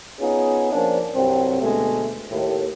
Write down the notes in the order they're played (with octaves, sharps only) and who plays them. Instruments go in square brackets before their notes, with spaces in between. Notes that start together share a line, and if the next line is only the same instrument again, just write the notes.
[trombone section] B3 C#4 D#4 F4 G#4
F3 A#3 C#4 D4
C2 G2 F#3 C4
D2 B2 G#3 A3
D#2 A2